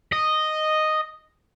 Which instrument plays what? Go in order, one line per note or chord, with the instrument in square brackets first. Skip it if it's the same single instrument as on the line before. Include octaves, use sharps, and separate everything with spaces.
[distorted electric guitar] D#5